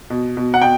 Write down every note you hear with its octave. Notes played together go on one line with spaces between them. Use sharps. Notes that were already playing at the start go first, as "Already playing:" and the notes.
B2
B2
F#5
B2 G5